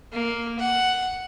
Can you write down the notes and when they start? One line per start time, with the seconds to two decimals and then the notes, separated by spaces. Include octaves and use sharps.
0.12 A#3
0.59 F#5